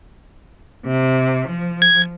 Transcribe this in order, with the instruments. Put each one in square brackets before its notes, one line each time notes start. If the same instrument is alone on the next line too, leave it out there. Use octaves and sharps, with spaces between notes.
[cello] C3
F3
[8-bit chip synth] G#6